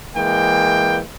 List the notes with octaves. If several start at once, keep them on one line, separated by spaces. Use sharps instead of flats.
E3 G#3 A#3 G5